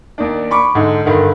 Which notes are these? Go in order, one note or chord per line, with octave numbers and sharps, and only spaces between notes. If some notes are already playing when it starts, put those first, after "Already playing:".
D#2 D4
B5 C#6 D6
G#2 D3
G2 D3 D#3